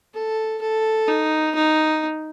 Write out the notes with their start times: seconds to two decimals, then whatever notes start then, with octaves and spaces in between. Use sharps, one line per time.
0.14 A4
0.62 A4
1.08 D#4
1.55 D#4